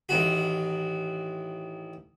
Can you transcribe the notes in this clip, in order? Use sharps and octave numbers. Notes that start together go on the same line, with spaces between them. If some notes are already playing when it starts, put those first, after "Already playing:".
A1 D#3 F#4